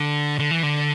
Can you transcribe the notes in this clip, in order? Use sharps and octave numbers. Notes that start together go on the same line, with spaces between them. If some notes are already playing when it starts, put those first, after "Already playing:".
Already playing: D3
D3
E3
D3